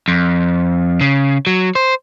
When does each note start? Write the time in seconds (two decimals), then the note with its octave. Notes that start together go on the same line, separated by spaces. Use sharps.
0.08 F2
1.01 C#3
1.47 F#3
1.75 C5